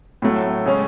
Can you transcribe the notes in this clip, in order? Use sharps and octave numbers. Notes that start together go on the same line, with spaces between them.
A2 F#3 A3
C#3 G#3 C#4